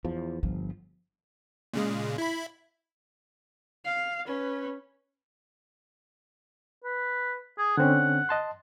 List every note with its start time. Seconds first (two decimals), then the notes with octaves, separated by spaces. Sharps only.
0.05 E2 F3
0.43 G1 F3
1.73 A#2 C#3 G#3
2.18 E4 B5
3.85 F5
4.27 C#4 B4
6.84 B4
7.58 G#4
7.77 D3 C4 C#4 F#5
8.29 D#5 A5 C6